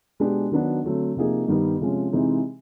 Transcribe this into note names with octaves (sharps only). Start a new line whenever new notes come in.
B2 G#3 B3 D4 G4
D#3 F#3 B3 D4 F#4
D3 F#3 A3 C4
C3 F3 A#3 D#4 G#4
G2 D#3 G3 B3 D#4
C3 F3 G#3 C#4
C3 E3 G#3 C4 D#4